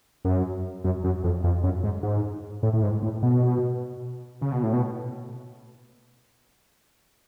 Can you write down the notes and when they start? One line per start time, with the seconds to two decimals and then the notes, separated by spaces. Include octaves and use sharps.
0.25 F#2
0.84 F#2
1.04 F#2
1.24 F2
1.44 F2
1.63 F#2
1.84 G#2
2.03 G#2
2.63 A2
2.73 A2
2.83 G#2
3.03 A2
3.23 B2
4.41 C#3
4.52 B2
4.63 A2
4.73 B2